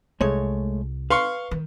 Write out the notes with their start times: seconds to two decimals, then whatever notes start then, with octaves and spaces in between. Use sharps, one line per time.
0.21 C2 G#3 A3 C#5
1.10 B4 F5 C6 C#6
1.51 D#3